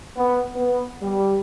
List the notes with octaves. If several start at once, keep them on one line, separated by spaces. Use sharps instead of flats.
B3
B3
G3